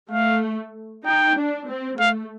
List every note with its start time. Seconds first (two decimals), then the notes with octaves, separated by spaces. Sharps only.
0.11 A3 F5
1.06 D#4 G5
1.37 D4
1.69 C4
2.00 A3 F5